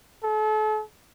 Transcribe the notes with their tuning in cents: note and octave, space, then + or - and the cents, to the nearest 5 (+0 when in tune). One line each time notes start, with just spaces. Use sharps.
A4 -40